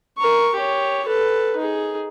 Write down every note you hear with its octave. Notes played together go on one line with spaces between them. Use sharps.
A#4 C#6
G4 C#5
A4 B4
D#4 G#4